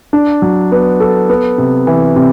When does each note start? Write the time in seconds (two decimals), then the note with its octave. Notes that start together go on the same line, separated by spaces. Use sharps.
0.13 D4
0.42 F#3
0.72 B3
1.00 A4
1.29 B3
1.58 C3
1.87 E3
2.16 C3